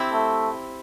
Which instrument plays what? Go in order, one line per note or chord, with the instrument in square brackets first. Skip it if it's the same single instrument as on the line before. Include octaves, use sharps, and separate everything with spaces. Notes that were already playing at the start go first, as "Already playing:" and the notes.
Already playing: [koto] C4 E4 G4
[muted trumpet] A3